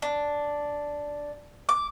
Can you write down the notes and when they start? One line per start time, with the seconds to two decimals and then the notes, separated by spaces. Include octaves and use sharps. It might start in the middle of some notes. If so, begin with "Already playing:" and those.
0.02 D4
1.69 D6